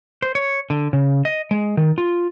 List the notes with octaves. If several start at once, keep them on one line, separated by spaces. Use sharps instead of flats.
C5
C#5
D3
C#3
D#5
G#3
D#3
F4